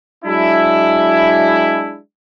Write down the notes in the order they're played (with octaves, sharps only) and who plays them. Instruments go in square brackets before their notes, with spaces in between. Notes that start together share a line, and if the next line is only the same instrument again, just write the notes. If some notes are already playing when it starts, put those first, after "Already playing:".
[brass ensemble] F#3 G#3 D4 E4